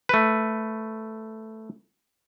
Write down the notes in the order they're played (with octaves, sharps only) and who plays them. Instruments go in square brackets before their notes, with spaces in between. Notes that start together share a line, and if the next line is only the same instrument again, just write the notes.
[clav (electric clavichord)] A3 B4